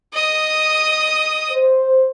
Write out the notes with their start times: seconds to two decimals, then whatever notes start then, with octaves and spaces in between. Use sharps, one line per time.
0.13 D#5 D#6
1.50 C5